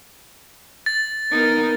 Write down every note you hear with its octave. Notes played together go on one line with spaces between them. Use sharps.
A6
B3 D#4 A#4